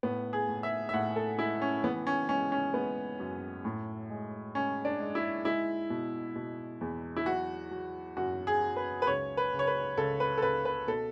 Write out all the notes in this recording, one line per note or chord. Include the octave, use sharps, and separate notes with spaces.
A2 B3
G#4
A2
E5
E5
A2 F#5
A4
G#3 E4
C#4
E3 B3
C#4
G#3 C#4
C#4
G#3 B3
F#2
A2
G#3
G#3 C#4
D4
G#3
E4
G#3 E4
B2
B2
E2
E4
F#3 F#4
F#3
F#2 F#4
G#4
F#3
B4
B4
C#2 C#5
B4
C#3
C#5
B4
C#2 A4
B4
A4
C#2 B4
B4
B2 A4